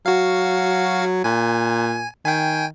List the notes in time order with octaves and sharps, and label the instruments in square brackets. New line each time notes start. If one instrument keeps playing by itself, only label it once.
[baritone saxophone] F#3 [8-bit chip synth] F#4 F5
[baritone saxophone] A#2 [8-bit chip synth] G#5
[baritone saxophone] D#3 [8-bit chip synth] G5 G#5